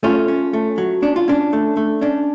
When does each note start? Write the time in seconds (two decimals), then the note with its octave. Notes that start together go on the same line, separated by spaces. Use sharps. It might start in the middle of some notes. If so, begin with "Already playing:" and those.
0.03 A3 C#4 F4
0.28 C#4
0.53 A3
0.78 F#3
1.02 C#4 D4
1.16 F4
1.28 C#4 D4
1.53 A3
1.77 A3
2.01 C#4 D4